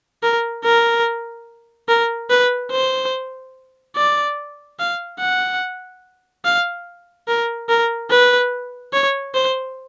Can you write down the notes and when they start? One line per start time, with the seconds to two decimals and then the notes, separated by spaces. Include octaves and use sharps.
0.23 A#4
0.64 A#4
1.88 A#4
2.30 B4
2.71 C5
3.96 D5
4.79 F5
5.20 F#5
6.45 F5
7.28 A#4
7.69 A#4
8.11 B4
8.93 C#5
9.35 C5